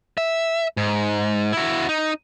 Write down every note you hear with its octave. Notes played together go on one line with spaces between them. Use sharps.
E5
G#2
E4 F#4
D#4